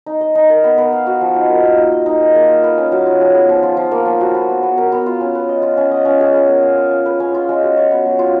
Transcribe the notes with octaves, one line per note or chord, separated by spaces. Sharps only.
D#4
D#5
D#4
A#4
B3
B4
F5
F#4
F3
D#4
A#4
A#3
D#4
D#5
D#4
G#4
A#3
F4
B4
C#4
F#3
F4
G#4
B3
F3
F4
F3
A#3
F3
F#4
B4
B3
B3
A#4
B3
F4
C#4
B4
D#5
F4
C#4
D#5
C#4
G#4
B3
A#4
F5
F4
C#4
B4
C#4
F4
G#3
F#4
C#5
B3
F#3
F4